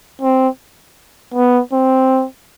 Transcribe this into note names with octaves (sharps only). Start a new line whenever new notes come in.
C4
B3
C4